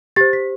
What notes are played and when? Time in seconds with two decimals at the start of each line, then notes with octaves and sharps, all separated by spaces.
0.16 G4 C5 A6
0.33 B6